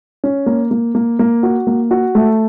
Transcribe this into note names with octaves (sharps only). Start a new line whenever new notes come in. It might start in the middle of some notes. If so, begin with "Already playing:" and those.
C#4
A#3
A#3
A#3
A#3
F#4
A#3
F#4
A3